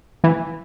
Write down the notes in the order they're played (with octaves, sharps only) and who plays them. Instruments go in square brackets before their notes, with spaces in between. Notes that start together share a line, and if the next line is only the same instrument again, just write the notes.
[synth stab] E3